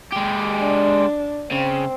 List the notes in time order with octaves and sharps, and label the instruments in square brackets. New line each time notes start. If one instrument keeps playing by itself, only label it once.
[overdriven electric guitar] G#3 G4
[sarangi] D4
[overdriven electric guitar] C#3 [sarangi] C4